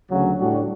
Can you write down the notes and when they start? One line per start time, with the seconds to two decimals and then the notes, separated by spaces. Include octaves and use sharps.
0.10 D2 C#3 F#3 C#4
0.38 A2 G3 D4 F#4